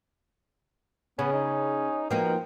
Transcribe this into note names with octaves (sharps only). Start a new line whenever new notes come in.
C#3 B3 C#4
D#4
B2 F3 A#3 D#4 G5